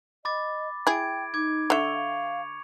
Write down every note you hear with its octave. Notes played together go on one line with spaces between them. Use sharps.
D#5 B5 D6 A6
E4 G#4 G5 G#6 D7
D#4 D6 G#6
D3 E5 C#6 C#7 F7
F5